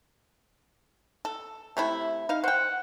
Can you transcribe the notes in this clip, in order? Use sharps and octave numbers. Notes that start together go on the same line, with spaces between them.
A4
C3 A3 E4
D#4 F5
C5 F#5 G5